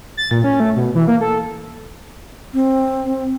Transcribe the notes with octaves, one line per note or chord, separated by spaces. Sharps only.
A6
A#2
C#4
A3
B2
E3
A#3
A4
C4